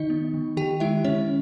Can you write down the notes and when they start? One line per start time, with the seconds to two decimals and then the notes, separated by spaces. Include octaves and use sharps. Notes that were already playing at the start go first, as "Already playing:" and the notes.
Already playing: D#3 D#4 D#5
0.10 B3
0.34 D#3
0.57 D#3 G4 G5
0.80 G#3 E4 E5
1.04 D#3 C#4 C#5